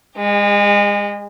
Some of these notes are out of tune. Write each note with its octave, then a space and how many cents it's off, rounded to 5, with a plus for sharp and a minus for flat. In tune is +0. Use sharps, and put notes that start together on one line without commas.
G#3 -30 G4 +45